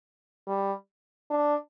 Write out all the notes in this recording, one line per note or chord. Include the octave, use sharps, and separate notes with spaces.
G3
D4